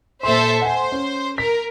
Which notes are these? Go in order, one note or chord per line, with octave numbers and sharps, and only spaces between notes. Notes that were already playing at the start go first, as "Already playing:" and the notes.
A#2 A4 C5 E5 C6
C5 F#5 G#5
C#4
A#4 B6